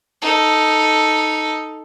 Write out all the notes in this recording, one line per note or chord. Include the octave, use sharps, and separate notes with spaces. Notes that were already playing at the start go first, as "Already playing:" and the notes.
D#4 A4